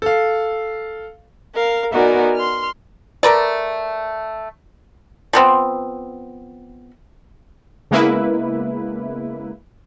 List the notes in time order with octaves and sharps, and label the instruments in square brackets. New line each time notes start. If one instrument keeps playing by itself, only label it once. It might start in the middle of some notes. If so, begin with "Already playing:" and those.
[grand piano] A4 F5
[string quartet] A#4 F5
B3 D#4 F#4 A#4 D5 G#5
C6 F6
[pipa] A3 A#4 B4 D5
F3 B3 C4
[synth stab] C#3 G#3 A#3 B3 E4 B4